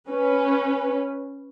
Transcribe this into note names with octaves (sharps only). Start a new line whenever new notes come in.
C#4 B4